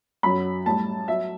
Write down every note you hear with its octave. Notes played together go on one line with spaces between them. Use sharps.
F#2 F#3 B5
A2 G3 A5
F#3 E5